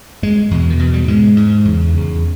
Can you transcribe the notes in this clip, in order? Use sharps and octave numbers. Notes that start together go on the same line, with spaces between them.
G2 G#3
E2 B2
D#3
E2 B2 E3
G3
G#2 G#3
G#2
E2 C#3
E2 C#3